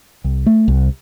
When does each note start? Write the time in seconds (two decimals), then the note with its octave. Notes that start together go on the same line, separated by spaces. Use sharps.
0.24 C2
0.46 A3
0.68 C2